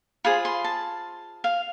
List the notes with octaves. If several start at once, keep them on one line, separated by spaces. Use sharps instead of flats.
F4 G#4 C5 B5
C6
A5
F5